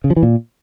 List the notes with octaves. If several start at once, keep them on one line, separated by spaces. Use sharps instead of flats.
C#3
F3
E3
A#2